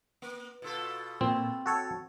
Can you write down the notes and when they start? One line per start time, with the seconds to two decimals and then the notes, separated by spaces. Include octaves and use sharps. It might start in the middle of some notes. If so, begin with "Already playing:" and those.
0.22 A#3
0.62 B2 F4 A4
1.21 A#2 C4
1.66 F#4 A4 C#5